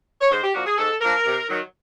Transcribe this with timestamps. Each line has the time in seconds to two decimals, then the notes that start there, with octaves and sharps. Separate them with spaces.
0.21 C#5
0.31 G#2 C5
0.43 G4
0.54 F3 A#3 D4 F#4
0.66 G#4
0.78 G#2 A4
1.01 F3 A#3 D4 A#4
1.26 C3
1.49 D#3 F#3